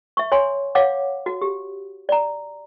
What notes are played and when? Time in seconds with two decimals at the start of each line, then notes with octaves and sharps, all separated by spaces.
0.17 E5 C#6
0.32 C#5 G#5 C6
0.75 C#5 F5 F#5 D6
1.26 F#4
1.42 G4
2.09 D5 A#5